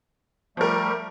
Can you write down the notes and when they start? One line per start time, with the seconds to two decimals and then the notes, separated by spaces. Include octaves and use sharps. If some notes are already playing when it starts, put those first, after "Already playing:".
0.57 F3 G3 A3 A#4